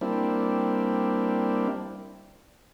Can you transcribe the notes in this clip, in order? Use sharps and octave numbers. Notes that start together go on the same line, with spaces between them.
G3 A#3 C4 D4 E4